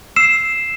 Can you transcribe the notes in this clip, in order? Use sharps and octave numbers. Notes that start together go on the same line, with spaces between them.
E6 C7 E7